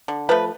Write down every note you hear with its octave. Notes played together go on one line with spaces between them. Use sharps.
D3
F3 A3 B4